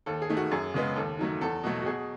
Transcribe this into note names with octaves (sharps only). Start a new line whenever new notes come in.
D#2 A4
G#4
D#3 A3
F#4
F#2 G#4
C#3 G#3 B3
D#2 A4
D#3 F#3 A3
E2 A4
B2 F#3 A3
F#4
B2 G#4